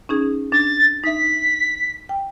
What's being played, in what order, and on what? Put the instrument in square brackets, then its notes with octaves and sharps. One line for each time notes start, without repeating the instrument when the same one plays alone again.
[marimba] C#4 D#4 G#4
[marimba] D4 [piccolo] A6
[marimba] D#4 E5 [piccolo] B6
[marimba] G5